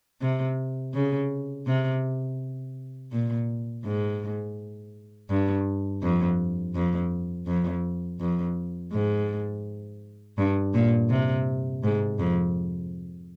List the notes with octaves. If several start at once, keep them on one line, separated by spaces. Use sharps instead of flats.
C3
C#3
C3
A#2
G#2
G2
F2
F2
F2
F2
G#2
G2
A#2
C3
G#2
F2